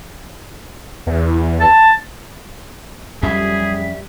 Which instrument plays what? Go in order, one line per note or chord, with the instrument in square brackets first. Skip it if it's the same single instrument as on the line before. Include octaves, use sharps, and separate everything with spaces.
[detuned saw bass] E2
[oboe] A5
[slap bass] F2 F#3 C#4 [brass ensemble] G3 [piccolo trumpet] G#4 [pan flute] E5